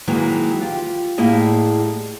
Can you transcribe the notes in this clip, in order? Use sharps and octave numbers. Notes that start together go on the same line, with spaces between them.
D#3 E3 F#3 G#3 A#3
F4 G4
A2 G3 A#3 E4 G#4 D#5